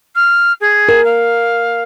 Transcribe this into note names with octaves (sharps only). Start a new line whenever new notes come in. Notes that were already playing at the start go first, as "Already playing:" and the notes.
F6
G#4
A#4
F5